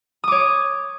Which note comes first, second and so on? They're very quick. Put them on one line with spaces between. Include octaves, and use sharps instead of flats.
D#6 D6 C#5